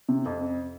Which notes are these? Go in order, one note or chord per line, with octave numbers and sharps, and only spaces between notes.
C3
F2